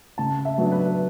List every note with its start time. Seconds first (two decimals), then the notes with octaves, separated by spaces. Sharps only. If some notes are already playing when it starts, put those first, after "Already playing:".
0.18 C#3 A5
0.45 E5
0.58 F#3 B3 D4
0.72 B4